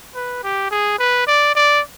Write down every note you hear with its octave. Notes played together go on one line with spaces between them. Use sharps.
B4
G4
G#4
B4
D5
D5